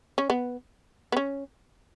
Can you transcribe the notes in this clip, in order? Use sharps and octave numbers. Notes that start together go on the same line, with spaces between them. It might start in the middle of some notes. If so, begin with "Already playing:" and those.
C#4
B3
B3
C#4